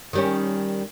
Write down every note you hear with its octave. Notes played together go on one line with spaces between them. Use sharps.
D#3 G3 C#4